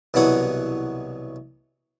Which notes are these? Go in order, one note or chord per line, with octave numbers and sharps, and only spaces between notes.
C2 B2 E3 F#3 F#5 D#6